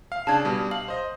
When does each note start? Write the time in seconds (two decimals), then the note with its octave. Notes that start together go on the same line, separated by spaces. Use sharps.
0.12 F5
0.27 C#3 D4 A5 G#6
0.45 B2 G3
0.71 F5 F#7
0.88 C5 D#5